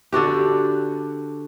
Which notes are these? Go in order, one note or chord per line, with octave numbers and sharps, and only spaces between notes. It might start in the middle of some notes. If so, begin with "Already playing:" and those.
D3 D4 F#4 G4